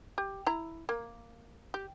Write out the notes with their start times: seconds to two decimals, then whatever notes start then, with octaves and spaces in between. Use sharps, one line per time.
0.18 G4
0.47 E4 A#5
0.89 A#3
1.74 G4